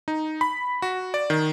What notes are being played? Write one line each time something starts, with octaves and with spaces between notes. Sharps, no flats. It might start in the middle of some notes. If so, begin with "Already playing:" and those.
D#4
B5
F#4
D5
D#3